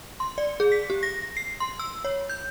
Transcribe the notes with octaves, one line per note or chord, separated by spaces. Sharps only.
C6
D5
G#4
B6
G4
A#6
C7
C6
E6
C#5
G6